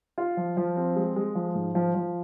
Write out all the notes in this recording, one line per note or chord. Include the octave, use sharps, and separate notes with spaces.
F4
F3
F3
C4
G#3
G#3
F3
G#2
F3
F3